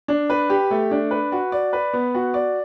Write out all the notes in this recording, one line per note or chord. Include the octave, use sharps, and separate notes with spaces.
D4
B4
G4
A3
D4
B4
F#4
D5
B4
B3
F#4
D5